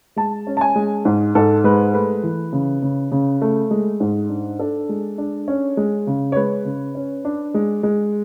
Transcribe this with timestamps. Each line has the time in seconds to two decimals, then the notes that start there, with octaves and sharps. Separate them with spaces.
0.16 G#3 A5
0.47 C#4
0.57 A5
0.61 G#5
0.76 G#3
1.05 G#2
1.35 G#2 A4
1.64 G#3 B4
1.94 A3 B4
2.23 E3
2.53 C#3
2.82 C#3
3.12 C#3
3.42 A3
3.71 G#3
4.00 G#2
4.29 D4
4.59 D4 A4
4.89 G#3
5.18 D4
5.48 C#4
5.77 G#3
6.07 C#3
6.32 C#5
6.36 G#3 B4
6.65 C#3
6.95 C#4
7.25 D4
7.54 G#3
7.83 G#3